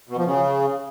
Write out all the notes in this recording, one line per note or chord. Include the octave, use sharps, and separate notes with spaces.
B2
F3
C#3